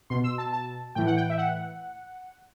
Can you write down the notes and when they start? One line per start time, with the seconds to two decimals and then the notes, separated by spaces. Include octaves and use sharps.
0.10 B2 C6
0.24 E6
0.38 A5
0.53 A5
0.95 A2 E3 G5
1.07 F#5
1.17 G5
1.30 E5
1.38 F#5